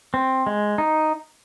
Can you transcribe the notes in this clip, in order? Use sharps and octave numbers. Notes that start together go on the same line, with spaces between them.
C4
G#3
D#4